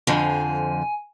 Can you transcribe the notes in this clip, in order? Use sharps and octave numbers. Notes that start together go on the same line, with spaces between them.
F2 D3 F3 G#5